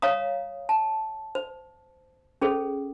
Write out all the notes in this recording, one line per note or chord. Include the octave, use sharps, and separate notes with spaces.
C#5 F5 A#5 D#6
A5
C5
C#4 G#4 A4 C5